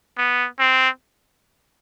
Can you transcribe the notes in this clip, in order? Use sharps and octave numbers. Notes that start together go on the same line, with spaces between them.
B3
C4